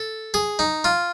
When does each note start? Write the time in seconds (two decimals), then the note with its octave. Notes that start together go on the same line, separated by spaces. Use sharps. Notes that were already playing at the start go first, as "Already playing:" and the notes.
Already playing: A4
0.34 G#4
0.59 D#4
0.84 F4